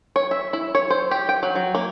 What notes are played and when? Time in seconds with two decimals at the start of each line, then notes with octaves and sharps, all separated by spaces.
0.16 C#5
0.31 E5
0.53 E4
0.75 C#5
0.90 C5
1.11 G4
1.29 G5
1.43 F#3
1.55 F#3
1.75 A#3